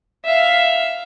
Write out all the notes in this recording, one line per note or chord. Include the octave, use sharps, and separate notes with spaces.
E5 F5